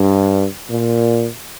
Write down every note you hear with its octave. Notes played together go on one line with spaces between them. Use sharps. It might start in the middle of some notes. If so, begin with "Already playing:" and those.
Already playing: G2
A#2